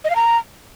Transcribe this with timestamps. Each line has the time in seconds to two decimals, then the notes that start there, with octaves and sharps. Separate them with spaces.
0.04 D#5
0.10 F5
0.15 A#5